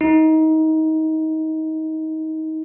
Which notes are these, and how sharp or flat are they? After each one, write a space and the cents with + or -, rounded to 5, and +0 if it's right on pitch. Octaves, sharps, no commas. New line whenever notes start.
D#4 +25